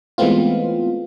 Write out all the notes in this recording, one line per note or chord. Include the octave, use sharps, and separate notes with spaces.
E3 G#3 A3 B3 C4 F4